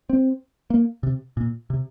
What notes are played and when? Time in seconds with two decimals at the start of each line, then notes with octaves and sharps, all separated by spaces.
0.10 C4
0.70 A#3
1.03 C3
1.37 A#2
1.70 C3